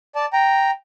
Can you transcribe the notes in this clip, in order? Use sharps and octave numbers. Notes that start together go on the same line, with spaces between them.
D5 A5
G5 A#5